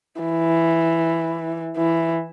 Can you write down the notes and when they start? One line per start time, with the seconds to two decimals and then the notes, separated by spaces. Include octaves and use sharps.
0.21 E3
1.77 E3